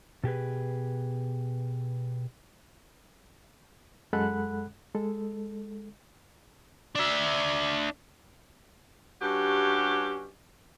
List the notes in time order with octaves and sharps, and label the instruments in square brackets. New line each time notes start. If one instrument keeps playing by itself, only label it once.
[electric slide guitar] B2 G4 G#4 B4
[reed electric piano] F#2 G#3 A4 F#5 B5 F#6
G#3 A4
[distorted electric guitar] D4 E5
[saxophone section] G2 C#4 F#4 G4